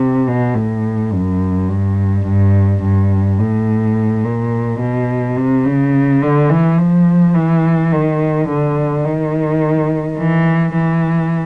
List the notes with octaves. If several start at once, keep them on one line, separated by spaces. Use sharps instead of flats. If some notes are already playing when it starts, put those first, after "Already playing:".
Already playing: C3
B2
A2
F#2
G2
G2
G2
A2
A#2
B2
C3
C#3
D3
E3
F3
E3
D#3
D3
D#3
E3
E3